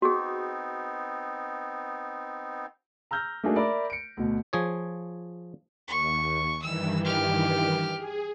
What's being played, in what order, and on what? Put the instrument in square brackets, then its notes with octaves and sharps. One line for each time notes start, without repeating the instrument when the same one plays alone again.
[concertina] B3 C4 D#4 [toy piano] F#4 G#4
[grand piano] A#5 E6 F6 G6 A#6
A3 A#3 D4 D#4 F#4 G#4
A#4 D5 E5 B5 D6
C#7 D7
D2 B2
[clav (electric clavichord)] F3 G#4 C#5
[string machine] D#2 [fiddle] C#6
[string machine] G2 D#3 E3 [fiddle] E6
[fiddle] G4 F6
[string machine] G#4